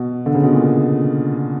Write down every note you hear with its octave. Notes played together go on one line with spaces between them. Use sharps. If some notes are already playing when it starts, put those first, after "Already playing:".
Already playing: B2
D3
C#3
B2
A#2